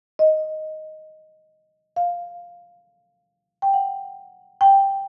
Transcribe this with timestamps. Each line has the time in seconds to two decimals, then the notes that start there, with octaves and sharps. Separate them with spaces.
0.19 D#5
1.96 F5
3.62 G5
3.74 F#5
4.61 G5